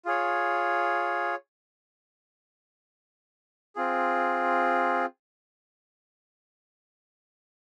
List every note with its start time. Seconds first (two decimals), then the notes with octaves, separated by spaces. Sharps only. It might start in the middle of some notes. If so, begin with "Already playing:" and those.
0.05 F4 G#4 C#5
3.76 C4 F4 G#4